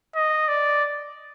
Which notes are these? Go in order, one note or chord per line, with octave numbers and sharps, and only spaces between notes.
D#5
D5